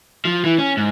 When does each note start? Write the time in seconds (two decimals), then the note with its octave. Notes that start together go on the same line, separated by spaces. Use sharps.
0.25 F3
0.44 E3
0.58 C#4
0.77 G#2